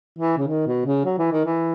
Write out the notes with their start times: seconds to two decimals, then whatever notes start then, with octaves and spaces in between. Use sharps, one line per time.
0.19 E3
0.37 C#3
0.47 D#3
0.67 B2
0.85 C#3
1.05 F#3
1.18 E3
1.31 D#3
1.45 E3